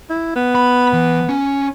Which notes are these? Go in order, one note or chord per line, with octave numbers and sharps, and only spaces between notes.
E4
B3
B5
E3
C#4